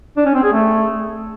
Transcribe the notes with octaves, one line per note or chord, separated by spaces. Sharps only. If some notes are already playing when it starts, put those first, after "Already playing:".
D4
C#4
C4
G#4
A3